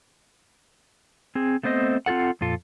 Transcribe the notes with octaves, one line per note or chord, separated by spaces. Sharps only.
C4 G#4
A3 B3 C4 C5 D#5
C4 F4 G#4 A4 F#5
F2 A#2 F4 A4